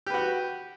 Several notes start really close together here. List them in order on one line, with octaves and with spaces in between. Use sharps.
G4 B4 F#4